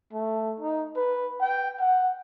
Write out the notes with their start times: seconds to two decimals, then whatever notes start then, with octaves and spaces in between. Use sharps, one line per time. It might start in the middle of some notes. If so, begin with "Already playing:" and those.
0.13 A3
0.60 D#4
0.96 B4
1.41 G5
1.79 F#5